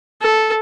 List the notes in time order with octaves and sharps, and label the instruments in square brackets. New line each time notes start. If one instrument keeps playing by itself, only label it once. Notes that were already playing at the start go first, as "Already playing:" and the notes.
[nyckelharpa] A4